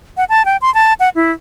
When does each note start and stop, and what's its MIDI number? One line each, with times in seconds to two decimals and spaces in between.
0.17 0.24 78
0.29 0.45 81
0.45 0.57 79
0.62 0.73 84
0.74 0.93 81
1.00 1.09 78
1.15 1.32 64